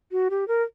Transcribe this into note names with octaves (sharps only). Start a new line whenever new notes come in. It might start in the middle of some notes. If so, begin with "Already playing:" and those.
F#4
G4
A#4